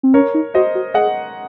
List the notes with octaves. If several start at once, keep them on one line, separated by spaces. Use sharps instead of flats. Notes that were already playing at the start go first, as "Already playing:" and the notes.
C4
C#4 A#4 C#5
D#4
F#4 C5 D#5
F#4
G#4 D#5 F#5